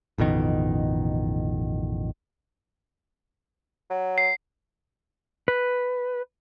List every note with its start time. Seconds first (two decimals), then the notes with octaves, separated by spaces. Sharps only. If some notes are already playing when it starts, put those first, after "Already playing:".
0.18 A1 F2 B2 D#3
3.90 F#3
4.18 C7
5.48 B4